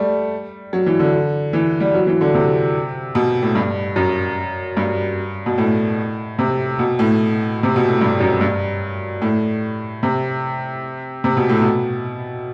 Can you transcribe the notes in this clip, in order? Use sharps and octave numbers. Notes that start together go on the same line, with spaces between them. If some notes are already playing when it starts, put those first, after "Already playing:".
Already playing: G3 A3
F#3
E3
D3
E3
G3
F#3
E3
D3
C3
B2
A2
G2
F#2
G2
B2
A2
C3
B2
A2
C3
B2
A2
G2
F#2
G2
A2
C3
C3
B2
A2
B2